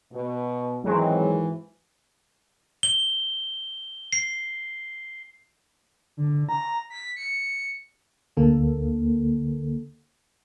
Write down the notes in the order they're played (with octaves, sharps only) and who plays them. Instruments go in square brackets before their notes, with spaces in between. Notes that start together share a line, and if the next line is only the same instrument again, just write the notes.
[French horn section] B2
[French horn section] G#2 D#3 E3 [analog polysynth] F#3 G#3 C4
[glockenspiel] G7
C7
[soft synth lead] D3
A#5
B6
C#7
[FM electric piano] D2 D3 A#3 A4